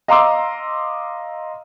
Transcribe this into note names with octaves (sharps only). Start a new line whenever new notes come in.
D#5 F5 A#5 C6 D6 E6